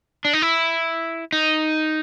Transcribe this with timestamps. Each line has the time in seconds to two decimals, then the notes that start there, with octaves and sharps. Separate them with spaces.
0.25 D4
0.33 D#4
0.42 E4
1.32 D#4